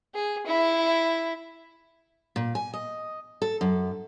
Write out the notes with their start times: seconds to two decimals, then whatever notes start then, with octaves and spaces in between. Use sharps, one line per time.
0.14 G#4
0.46 E4
2.36 A#2
2.55 G#5
2.74 D#5
3.42 A4
3.61 F#2